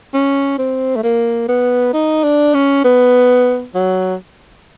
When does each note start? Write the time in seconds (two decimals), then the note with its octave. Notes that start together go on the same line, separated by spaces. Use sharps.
0.14 C#4
0.58 C4
0.96 A3
1.03 A#3
1.48 B3
1.93 D#4
2.24 D4
2.54 C#4
2.84 B3
3.74 F#3